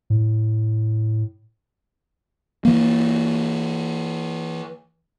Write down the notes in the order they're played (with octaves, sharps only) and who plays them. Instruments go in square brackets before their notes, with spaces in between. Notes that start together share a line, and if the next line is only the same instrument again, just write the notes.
[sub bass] A2
[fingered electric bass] E3 A#3